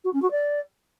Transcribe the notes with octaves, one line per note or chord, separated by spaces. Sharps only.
F#4
C#4
F#4
D5